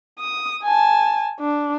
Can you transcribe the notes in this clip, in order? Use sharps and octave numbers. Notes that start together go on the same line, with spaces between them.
D#6
G#5 A5
D4